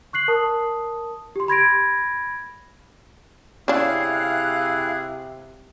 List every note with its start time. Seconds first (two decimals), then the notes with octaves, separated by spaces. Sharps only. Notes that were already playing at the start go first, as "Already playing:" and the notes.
0.13 C#6 F#6 C7 F#7
0.28 A#4 A5 D#6
1.36 G4 C6
1.48 B5 G#6 A#6 D7
3.68 C3 C#4 D4 E4 G#4 F5 F#6